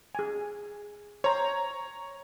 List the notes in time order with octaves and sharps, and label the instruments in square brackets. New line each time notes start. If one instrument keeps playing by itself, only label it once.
[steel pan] G#4 G#5
[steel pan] C5 [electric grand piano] C#5 A#5